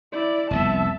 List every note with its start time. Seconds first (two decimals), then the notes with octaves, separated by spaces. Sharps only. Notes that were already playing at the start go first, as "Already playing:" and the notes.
0.12 E4 D5
0.51 F1 C2 B3 E5 A5